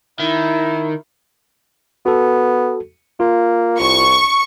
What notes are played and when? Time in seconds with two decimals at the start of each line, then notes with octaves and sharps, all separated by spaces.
0.20 D#3 E4
2.06 B3 F#4 A4
3.20 A#3 F4
3.80 C2 C#6